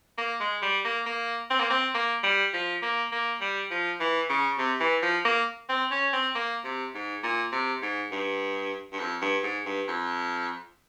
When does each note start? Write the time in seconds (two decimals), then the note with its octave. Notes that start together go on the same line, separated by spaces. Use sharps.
0.18 A#3
0.40 G#3
0.62 G3
0.85 A#3
1.06 A#3
1.50 C4
1.60 A#3
1.70 C4
1.94 A#3
2.23 G3
2.53 F3
2.82 A#3
3.12 A#3
3.41 G3
3.70 F3
4.00 E3
4.29 C#3
4.58 C3
4.80 E3
5.02 F3
5.25 A#3
5.69 C4
5.91 C#4
6.13 C4
6.35 A#3
6.64 C3
6.94 G#2
7.23 A#2
7.52 C3
7.82 G#2
8.11 G2
8.92 G2
8.99 F2
9.21 G2
9.43 G#2
9.65 G2
9.87 F2